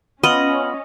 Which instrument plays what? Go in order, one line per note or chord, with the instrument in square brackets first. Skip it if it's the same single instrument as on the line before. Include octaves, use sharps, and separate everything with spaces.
[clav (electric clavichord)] B3 F4 [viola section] C#4 [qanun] D#5 [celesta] B5 F6 F#7